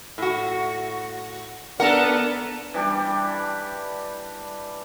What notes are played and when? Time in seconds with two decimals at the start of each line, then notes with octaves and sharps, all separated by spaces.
0.18 A2 F#4
1.80 B3 D4 A4 A#4 F#5
2.74 E3 G3 D4 G4